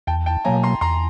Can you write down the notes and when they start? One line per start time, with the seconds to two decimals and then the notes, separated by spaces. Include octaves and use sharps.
0.07 E2 G5 A5
0.26 G5 A5
0.45 B2 F#3 A#3 G#5 A#5
0.63 A#5 C6
0.81 E2 A#5 C6